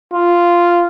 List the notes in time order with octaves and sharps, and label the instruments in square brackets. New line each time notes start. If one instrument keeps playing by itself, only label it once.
[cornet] F4